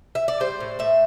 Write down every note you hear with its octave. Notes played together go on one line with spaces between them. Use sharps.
E5
D5
G3 C5
A2
A2 E5